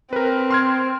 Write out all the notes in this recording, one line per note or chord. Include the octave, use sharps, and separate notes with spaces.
C4 A#4 B4
C6 F6 G#6